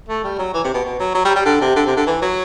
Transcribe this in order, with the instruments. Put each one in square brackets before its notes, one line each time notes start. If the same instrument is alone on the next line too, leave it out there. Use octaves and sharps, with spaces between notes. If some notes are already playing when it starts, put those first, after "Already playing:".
[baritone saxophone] A3
G3
F#3
E3
C3
B2
B2
F#3
F#3
G3
G3
D3
C3
D3
C3
D3
E3
F#3